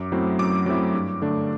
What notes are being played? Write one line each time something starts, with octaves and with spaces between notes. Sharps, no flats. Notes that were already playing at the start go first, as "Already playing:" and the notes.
Already playing: F#2 D6
F#3 A3 C4 E4
F#2 D6
F#3 A3 C4 E4
G2
D3 A3 D4